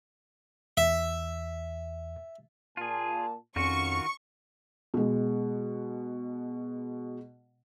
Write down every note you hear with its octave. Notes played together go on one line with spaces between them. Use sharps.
E2 E5
A#2 F4 G#4 A5
F2 D#3 C#4 F4 F#4 C#6
B2 G#3